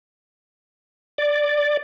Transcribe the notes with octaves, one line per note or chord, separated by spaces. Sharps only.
D5